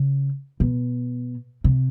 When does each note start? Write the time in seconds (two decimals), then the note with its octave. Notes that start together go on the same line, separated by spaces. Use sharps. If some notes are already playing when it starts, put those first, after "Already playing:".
Already playing: C#3
0.60 B2
1.64 C3